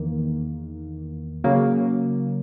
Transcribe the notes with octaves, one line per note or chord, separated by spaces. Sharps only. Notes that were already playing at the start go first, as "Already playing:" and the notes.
Already playing: E2 D#3 A#3
C#3 F#3 A#3